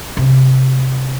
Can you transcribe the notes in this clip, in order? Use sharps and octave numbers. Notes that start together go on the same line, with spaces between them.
C3